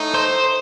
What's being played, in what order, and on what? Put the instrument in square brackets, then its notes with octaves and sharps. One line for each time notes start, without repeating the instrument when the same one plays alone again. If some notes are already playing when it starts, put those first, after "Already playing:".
Already playing: [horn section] A2 A3 D#4
[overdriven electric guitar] C5